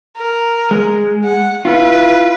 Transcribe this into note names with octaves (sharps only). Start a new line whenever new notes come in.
A#4
G#3
F#5
E4 F4 B4